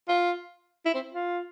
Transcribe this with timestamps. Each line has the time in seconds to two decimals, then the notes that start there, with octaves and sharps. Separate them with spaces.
0.08 F4
0.85 E4
0.95 C4
1.14 F4